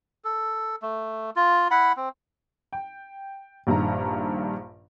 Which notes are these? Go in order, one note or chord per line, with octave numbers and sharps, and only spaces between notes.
A4
A3
F4
E4 F#5 B5
C4
G5
A#1 G2 D#3 A#5